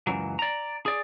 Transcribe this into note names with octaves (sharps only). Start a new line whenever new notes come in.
C#2 F#2 E3 F#3
D5 A#5
G#4 D5